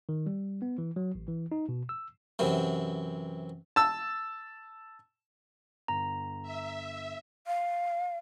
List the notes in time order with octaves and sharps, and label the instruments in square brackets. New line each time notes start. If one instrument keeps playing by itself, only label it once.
[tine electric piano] D#3
G3
B3
E3
F#3
A1
E3
D#4
B2
E6
[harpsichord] F#2 C3 E3
[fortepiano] A5 E6
[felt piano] G1 [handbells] A#5
[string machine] E5
[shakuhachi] F5